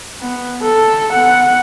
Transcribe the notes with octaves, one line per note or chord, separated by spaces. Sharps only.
B3
A4
B3 F#5